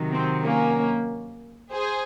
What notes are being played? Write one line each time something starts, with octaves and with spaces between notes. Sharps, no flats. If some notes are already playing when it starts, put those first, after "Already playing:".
Already playing: C3 D#3 F#3
C4
A#3 C#4
G#4 C5